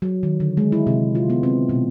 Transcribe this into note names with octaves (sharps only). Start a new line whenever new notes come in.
F#3
D#3
D3
G#3
E4
C3
F4
B3
C4
B2